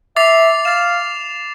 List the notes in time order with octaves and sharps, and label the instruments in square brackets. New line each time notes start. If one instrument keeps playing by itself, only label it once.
[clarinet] E5 [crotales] D6 A6 C7 F7
[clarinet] F5 [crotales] D6 A6 E7